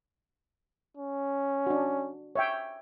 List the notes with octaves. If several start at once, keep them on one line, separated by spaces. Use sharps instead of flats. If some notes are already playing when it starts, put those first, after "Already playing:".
C#4
D4 F#4
C#5 E5 G5